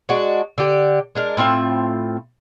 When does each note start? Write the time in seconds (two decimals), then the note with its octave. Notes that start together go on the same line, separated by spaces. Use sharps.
0.09 G#3 D4 F#4
0.58 D3 G4
1.15 G#3 D4 A#4
1.37 A2 C4 F4 E5